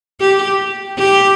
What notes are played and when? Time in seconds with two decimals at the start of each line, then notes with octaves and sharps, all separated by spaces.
0.21 G4
0.98 G4